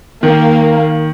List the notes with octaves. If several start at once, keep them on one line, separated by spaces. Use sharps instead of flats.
D#3 A#3